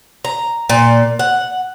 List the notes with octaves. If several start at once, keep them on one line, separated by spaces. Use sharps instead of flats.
A#5
A#2
F#5